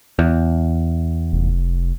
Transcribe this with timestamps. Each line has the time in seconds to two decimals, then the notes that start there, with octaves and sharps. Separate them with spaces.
0.19 E2
1.32 F1